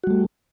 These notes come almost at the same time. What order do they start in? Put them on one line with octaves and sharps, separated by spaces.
F#4 G3 A3